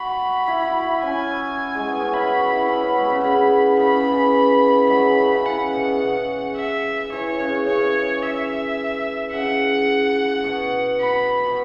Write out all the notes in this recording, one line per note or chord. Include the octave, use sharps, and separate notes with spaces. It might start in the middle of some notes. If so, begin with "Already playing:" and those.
Already playing: F#4 B5
E4
F#4
E4
C#4 G#5
G#3
B3
C#4
E4 B5
F#4
E4
C#4 B5
B3
G#3
C#3
C#3 B5
C#3 B5
E3
F#3 G#3 B5
E3
C#3
E3
C#3 F#5
B2
C#3
E5
E3 C#5
C#3
C#3 C#5
E5
C#3 F#5
B2
B5
B2